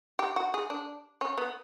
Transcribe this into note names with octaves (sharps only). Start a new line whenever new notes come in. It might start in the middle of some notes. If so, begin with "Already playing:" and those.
G4
F#4
G#4
D4
C#4
B3